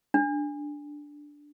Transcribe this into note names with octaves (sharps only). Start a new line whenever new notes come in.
D4